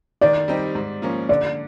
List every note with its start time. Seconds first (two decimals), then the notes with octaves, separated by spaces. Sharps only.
0.21 D#3 D5
0.48 G3 C4 D#4 G4
0.75 G#2
1.02 F3 A#3 C#4
1.29 D3 D5